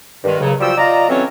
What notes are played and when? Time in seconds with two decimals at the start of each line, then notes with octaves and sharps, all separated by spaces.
0.24 G2 D#3 G#3
0.40 D#2 C#3 F#3
0.61 F3 G3 F#4 G5 E6
0.77 F4 D5 D#5 A#5
1.08 E3 F#3 C4 C#4 A4 C#5